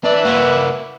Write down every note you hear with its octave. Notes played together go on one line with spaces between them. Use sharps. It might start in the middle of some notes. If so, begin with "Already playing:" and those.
D4 B4 E5
A#3 F#4